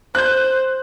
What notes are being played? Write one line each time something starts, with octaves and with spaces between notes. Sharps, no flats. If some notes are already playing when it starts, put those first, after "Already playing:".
C5 F#6 G6